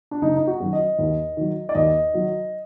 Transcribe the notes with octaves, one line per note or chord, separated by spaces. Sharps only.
D4
F#1 D#4
D#4
F#4
F#2 D#3
D#5
D#2
D#3 F#3
D5
D#2 D#5
D#3 F#3